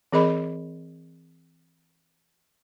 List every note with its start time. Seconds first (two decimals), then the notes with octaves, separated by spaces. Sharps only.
0.13 E3 C4 G#4 A#4 D#5 B5